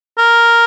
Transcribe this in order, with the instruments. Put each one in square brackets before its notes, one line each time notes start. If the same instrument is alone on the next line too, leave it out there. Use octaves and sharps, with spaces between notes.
[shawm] A#4